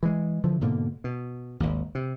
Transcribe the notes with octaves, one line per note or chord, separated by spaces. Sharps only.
E3 G#3
D3 E3 F3
G#2 B2 D3 A#3
B2
G#1 D#2
C3